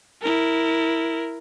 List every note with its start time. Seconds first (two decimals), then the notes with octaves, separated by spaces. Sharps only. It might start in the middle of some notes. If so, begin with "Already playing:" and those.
0.22 E4 A#4